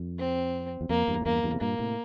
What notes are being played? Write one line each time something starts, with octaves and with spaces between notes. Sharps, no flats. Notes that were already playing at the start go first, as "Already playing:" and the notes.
Already playing: F2
C4
E2
F2 A#3
E2 G2
A2
E2 G2 A#3
E2 G2
C3
G2 A#2 A#3
A2 C3